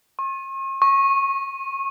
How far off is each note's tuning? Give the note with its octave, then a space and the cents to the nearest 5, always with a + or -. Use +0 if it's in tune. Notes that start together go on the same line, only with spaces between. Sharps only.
C#6 -45
C#6 -20